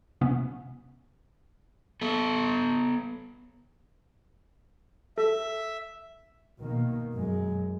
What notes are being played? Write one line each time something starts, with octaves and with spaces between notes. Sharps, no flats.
C3 B3 C#4
B3 A4
A4 E5
B2 D#3 A#3
F#2 G#3